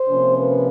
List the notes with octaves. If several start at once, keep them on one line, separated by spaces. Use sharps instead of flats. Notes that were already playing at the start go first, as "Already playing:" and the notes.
Already playing: C5
C3 F3 A#3 C#4
B4